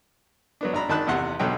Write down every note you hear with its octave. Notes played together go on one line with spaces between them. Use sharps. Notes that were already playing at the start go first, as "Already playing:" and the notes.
F#3 B3 D4
G#1 D4 A#5 B5
G#1 D#3 D4 A5 B5 F#6
A1 E2 C3 F#5 C6
B1 B2 D3 F#3 G5